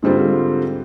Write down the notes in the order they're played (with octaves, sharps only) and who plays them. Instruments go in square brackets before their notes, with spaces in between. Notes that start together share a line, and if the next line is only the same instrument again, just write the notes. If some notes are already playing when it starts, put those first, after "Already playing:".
[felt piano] G#2 D3 G3 C4 F4